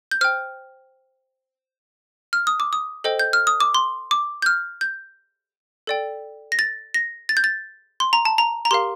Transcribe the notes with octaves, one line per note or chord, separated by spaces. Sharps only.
G6
C5 G5 F6
F6
D#6
D6
D#6
A4 C5 D#5 G5
G6
F6
D#6
D6
C6
D6
G6
F6
G6
A4 D5 G5
A#6
A6
A#6
A6
G6
A6
C6
A#5
A5
A#5
A#5
G4 A#4 F5 C6